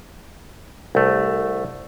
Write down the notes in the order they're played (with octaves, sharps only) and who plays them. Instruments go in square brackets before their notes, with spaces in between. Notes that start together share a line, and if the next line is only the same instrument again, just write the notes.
[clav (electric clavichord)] C2 A3